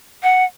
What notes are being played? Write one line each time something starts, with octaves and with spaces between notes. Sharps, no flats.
F#5